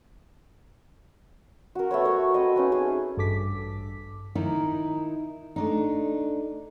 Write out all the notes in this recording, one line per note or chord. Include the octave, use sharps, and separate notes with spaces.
F#4 A#4
A3 B3 C#5
A3 A#4 C#5
C4 D#5
B3 C#4 D#4
G#4
A1 G2 A4 D6 B6
D#3 D#4 E4 A#4
A3 D4 D#4